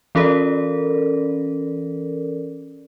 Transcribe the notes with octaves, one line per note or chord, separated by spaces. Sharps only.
E3 C#4 A4 A#4 D5